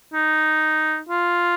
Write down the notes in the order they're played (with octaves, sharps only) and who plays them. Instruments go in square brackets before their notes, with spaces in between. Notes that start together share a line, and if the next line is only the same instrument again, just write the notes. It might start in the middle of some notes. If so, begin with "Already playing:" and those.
[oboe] D#4
F4